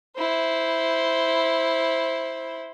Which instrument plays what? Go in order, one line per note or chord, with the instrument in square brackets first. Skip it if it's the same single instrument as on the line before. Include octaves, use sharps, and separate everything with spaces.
[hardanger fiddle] E4 C5